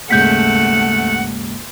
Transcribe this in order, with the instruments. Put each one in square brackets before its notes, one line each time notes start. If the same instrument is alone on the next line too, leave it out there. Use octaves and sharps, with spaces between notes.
[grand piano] D#2 G#2 C#3 [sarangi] A3 [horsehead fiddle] F#5 [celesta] G6 B6